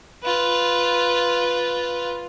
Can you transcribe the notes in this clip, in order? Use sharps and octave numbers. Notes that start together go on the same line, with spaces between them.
F4 B4